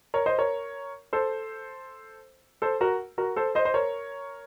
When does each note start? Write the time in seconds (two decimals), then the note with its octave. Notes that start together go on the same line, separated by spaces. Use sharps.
0.14 A#4 C#5
0.26 C5 D#5
0.38 A#4 C#5
1.13 A4 C5
2.62 A4 C5
2.81 F#4 A#4
3.18 F#4 A#4
3.36 A4 C5
3.55 C5 D#5
3.65 C5
3.74 A#4 C#5